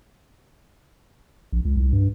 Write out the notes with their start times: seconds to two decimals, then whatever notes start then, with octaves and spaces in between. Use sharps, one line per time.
1.52 A#1
1.65 C#2
1.77 C2
1.93 G2